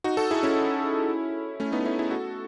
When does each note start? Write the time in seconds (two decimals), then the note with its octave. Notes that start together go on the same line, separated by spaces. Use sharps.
0.04 D#4 F#4
0.17 F#4 A4
0.31 E4 G#4
0.43 C#4 E4
1.60 A3 C#4
1.72 B3 D#4
1.85 C#4 E4
1.99 E4 G#4
2.11 F#4 A4